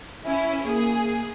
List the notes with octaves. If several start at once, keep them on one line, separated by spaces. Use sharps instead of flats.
C#4 E4 E5
A#3 G#4